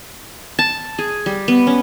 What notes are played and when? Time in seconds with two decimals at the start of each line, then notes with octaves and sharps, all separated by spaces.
0.59 A5
0.99 G#4
1.26 G3
1.48 B3
1.67 C#4